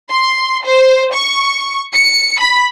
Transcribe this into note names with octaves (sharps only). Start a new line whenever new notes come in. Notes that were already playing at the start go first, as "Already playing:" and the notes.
C6
C5
C#6
C#7
B5